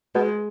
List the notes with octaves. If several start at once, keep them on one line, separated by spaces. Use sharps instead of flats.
B2 G#3